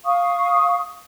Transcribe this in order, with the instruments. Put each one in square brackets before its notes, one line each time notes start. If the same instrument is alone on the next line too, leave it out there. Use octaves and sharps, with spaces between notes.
[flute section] F5 C#6 D#6